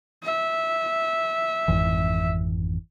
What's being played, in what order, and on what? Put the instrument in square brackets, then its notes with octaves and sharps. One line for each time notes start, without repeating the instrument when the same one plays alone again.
[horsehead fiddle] E5
[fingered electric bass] G#1 F2 E3